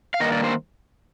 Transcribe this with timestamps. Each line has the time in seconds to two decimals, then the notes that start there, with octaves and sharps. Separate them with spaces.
0.14 F5
0.20 G2 D#3 A#3 D#5
0.32 D5
0.44 C5